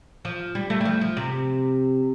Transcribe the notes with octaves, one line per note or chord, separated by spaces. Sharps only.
F3
G3
A3
G3
F3
F3
C3